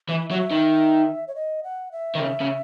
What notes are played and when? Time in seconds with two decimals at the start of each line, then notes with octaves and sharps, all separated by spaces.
0.09 E3 E5
0.30 F#3 E5
0.51 D#3
1.28 C#5
1.35 D#5
1.64 F#5
1.92 E5
2.15 D#3
2.20 C#3
2.41 C#3